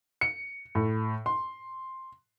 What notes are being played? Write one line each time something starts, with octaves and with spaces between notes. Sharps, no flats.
C#7
A2
C6